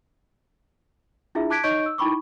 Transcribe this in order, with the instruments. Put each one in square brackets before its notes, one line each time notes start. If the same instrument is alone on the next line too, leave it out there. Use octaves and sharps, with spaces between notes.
[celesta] D4 E4 F4 G#4 E5
A5 D6 F#6 G#6 B6 D7
D#4 C#5 D#5 C#6 G6 D7
E6
D#4 E4 G5 B5 C#6 D6